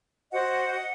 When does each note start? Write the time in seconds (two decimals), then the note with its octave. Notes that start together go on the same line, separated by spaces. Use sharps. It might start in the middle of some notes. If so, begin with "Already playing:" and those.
0.32 F#4 C5 D#5 F#5